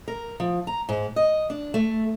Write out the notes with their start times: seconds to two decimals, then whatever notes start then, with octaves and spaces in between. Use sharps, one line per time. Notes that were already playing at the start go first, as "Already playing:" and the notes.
0.08 A#4
0.40 F3
0.67 A#5
0.89 G#2
1.16 D#5
1.50 D4
1.74 A3